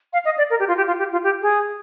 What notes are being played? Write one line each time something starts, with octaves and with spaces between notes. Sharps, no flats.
F5
D#5
D5
A#4
G4
F4
G4
F4
G4
F4
G4
G#4